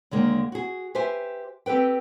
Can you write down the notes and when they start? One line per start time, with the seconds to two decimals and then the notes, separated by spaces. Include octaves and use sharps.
0.11 D#2 D3 G#3 A#3
0.52 F#4 G#4
0.95 G4 B4 C5 E5 G#5
1.66 C4 G4 A4 B4 G5